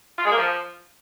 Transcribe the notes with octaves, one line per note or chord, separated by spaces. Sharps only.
F4
G#3
A#3
F3